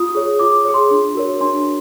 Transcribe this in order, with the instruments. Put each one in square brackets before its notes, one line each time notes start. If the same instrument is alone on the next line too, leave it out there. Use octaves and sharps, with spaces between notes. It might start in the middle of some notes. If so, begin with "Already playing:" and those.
Already playing: [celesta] F4 D#6
G#4 C#5
F4 D6
G#4 C#5
C6
D4
F#4 A#4 C#5
D4 C6